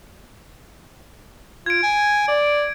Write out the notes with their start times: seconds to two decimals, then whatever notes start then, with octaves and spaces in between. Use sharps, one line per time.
1.66 F4 G#6 D7
1.83 G#5
2.28 D5